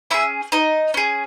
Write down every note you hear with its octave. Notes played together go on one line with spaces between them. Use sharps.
C#4 E4 G#4 E5
D#4 D#5
C#4 G#4